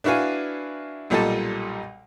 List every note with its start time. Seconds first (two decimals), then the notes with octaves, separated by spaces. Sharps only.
0.04 D4 E4 F#4 B4 F5 G#5
1.10 B1 A#2 G3 A4 D#5 A5